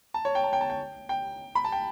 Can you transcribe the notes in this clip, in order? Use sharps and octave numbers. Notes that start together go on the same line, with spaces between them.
A5
C#5
G5
A5
G5
A5
G5
G5
B5
A5
G5